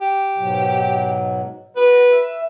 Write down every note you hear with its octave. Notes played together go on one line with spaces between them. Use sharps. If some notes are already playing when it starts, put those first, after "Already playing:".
G4
G#2 B2 F#3
F#4 B4
E5